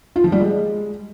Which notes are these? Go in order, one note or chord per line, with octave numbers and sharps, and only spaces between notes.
F4
F3
G3
G#3